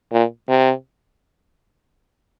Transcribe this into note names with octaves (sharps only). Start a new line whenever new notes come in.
A#2
C3